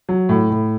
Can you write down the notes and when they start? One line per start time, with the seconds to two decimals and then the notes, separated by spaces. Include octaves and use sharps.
0.09 F#3
0.29 A2
0.50 A2